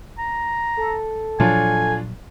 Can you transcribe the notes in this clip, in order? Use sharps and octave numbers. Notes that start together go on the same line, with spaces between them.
A#5
A4
A#2 F3 F#3 D4 F4 C#5 G#5